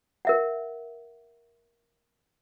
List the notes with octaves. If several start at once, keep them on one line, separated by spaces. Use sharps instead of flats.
A#4 E5 F#5